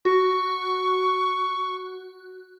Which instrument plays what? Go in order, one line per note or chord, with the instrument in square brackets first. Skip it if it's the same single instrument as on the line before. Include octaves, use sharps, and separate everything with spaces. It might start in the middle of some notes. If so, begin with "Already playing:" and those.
[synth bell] F#4 [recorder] C#6